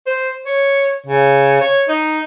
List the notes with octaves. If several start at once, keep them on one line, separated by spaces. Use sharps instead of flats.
C5
C#5
C#3
C#5
D#4